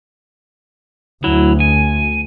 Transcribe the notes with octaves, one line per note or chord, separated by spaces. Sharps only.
D2 F#3 E4
G#5